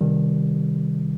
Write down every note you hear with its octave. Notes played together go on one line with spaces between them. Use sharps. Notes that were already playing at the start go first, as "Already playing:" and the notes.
C3 D#3 G3